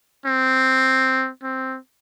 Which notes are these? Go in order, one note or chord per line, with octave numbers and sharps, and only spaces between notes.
C4
C4